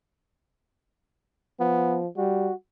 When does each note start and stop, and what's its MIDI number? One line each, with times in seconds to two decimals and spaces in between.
1.60 2.07 53
1.60 1.98 59
2.17 2.50 55
2.17 2.54 66